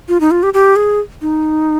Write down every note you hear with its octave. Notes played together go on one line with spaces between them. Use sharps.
F4
D#4
F4
G4
G4
G#4
D#4